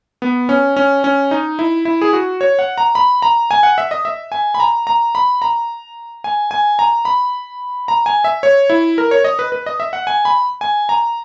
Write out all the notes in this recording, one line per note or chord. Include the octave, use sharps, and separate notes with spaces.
B3
C#4
C#4
C#4
D#4
E4
E4
G#4
F#4
C#5
F#5
A#5
B5
A#5
G#5
F#5
E5
D#5
E5
G#5
B5
A#5
A#5
B5
A#5
G#5
G#5
A#5
B5
A#5
G#5
E5
C#5
E4
A#4
C#5
D#5
B4
B4
D#5
E5
F#5
G#5
B5
G#5
A#5